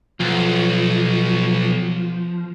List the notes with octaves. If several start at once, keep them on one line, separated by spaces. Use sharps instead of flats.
B1 F3